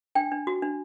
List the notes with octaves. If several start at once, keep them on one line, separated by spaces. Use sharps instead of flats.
D4 G5
D4
F#4
D4